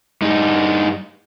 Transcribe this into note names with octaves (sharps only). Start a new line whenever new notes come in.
G2 D#4